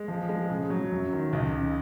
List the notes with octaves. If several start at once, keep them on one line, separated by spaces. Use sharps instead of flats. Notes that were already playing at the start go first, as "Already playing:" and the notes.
Already playing: G#3
F3
G#3
C#3
F#3
F#2
D#3
C#2
C#3